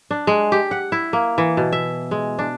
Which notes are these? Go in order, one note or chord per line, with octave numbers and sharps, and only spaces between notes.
D4
G#3
G4
F#5
E4
A#3
E3
B2
E5
G#3
D4